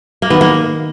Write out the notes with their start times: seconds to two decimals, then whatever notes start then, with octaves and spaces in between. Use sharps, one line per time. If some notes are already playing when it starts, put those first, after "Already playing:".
0.22 A#3
0.30 D#3 B3
0.41 A#3